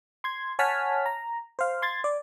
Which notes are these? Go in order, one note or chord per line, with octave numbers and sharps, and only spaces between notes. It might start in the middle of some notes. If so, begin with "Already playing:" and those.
C6 G#6
C#5 F#5 G#5 A5 F6 B6
A#5
C5 F5
C6 G#6 A6
D5